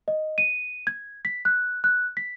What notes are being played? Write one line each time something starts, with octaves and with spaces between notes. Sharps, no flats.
D#5
D#7
G#6
B6
F#6
F#6
B6